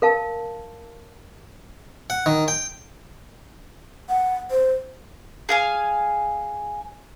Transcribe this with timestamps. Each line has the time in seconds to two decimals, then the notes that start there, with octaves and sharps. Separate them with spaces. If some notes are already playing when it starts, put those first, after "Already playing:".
0.02 A#4 F5 A5
2.10 F#5
2.26 D#3
2.48 G5
4.09 F#5
4.51 C5
5.49 G#4 F5 G#5